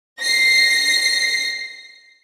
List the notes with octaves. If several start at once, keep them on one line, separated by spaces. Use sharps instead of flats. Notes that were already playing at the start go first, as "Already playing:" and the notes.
A#6 C7